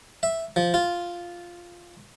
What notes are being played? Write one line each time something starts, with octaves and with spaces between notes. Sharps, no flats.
E5
F3
F4